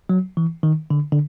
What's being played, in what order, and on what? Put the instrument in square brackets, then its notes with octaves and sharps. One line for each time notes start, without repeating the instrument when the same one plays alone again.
[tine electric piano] F#3
E3
D#3
D3
D3